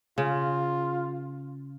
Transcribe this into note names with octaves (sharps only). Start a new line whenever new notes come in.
C#3 F4